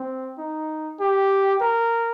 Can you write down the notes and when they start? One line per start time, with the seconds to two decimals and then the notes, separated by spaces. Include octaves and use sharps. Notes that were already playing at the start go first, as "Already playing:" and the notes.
Already playing: C4
0.38 D#4
1.00 G4
1.61 A#4